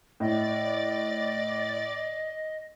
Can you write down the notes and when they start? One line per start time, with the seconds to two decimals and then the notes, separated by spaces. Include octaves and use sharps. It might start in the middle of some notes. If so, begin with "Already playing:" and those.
0.20 A2 D5 D#5 A6